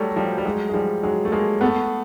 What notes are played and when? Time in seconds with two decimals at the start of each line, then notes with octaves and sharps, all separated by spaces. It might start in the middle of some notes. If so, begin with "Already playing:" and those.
Already playing: F#3 G3 A3
0.16 F3 G3
0.38 G3
0.45 F#3 G#3
0.69 G#3
0.74 F3 G3
1.03 F#3 G#3
1.25 A3
1.32 G#3 A#3
1.61 A3 B3